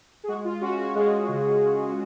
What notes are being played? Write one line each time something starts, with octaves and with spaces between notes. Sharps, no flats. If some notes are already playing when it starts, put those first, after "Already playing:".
G#4
G#3 F#4
F4
C#4 F#4
F#4
G#3 F4 G#4
C#3